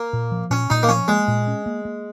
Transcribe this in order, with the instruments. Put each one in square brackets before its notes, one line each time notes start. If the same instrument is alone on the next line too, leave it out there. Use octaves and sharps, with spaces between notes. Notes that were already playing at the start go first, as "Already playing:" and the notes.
Already playing: [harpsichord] A#3
[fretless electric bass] A#2
F3
[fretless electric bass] A#2 [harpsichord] C#4
[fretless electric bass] A#2 [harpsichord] D#4
[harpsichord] A#3
[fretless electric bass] F3 [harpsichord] C#4
[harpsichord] G#3 [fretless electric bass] A#3
[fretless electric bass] A#2
C#4
A#3
A#3